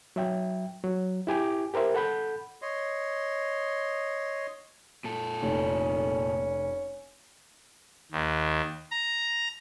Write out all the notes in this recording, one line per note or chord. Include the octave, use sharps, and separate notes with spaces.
F#3 E5 G5
F#3
E4 G4 G#5 D6
G4 A#4 C5 E5
A4 F#5 B5 G6
C#5 D#5 C6
A#2 A4
F1 C#4
D#2
A#5